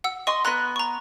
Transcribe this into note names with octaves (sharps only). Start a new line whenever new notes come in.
F#5 E6
D#5 C6 C#6
B3 A#5 C6 F#6 A#6
A#5 C#6